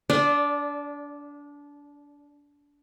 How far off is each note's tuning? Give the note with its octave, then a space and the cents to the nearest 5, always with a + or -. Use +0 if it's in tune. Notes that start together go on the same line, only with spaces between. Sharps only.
D4 -25 D5 +0 F5 +0